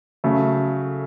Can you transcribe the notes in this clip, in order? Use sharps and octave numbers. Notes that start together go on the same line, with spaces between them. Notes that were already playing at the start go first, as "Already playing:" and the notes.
C#3 F#3 A3